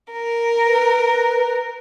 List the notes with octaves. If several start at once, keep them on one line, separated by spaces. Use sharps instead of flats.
A#4
B4